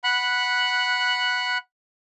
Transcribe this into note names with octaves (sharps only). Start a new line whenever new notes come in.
F#5 B5 F#6